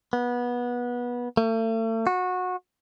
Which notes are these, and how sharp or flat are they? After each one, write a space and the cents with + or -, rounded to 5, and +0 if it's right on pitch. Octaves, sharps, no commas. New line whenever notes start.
B3 -20
A3 +40
F#4 -20